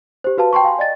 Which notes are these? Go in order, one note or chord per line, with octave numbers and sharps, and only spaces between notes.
G4 C5
F#4 B4 F5 A5
G5 A5 C6 C#6
F5 G#5 C6
D5 D#5 A6